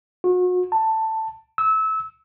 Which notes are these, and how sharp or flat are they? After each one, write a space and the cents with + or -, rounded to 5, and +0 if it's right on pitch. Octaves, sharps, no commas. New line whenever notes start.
F#4 -35
A5 +10
E6 -25